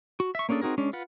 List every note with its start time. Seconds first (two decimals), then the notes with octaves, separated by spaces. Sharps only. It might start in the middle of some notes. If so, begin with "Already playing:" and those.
0.20 F#4
0.35 E5 C#6
0.49 A#3 C#4 D4 G#4 A4
0.61 C4 D#4 F#4 G#4 A#4
0.78 G#3 C#4 D4
0.93 F4 B4 F#5